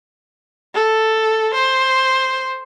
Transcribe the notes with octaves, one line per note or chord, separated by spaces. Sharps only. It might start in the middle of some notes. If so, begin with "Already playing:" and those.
A4
C5